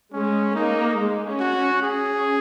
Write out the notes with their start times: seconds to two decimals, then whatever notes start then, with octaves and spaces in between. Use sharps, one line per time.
0.13 G#3 C#4
0.55 A#3 D#4
0.98 G#3
1.26 C#4
1.40 F#4
1.55 C#4
1.82 C#4 G#4